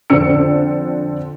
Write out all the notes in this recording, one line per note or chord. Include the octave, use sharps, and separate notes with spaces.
F2 D3 C4 D4 E6 C#7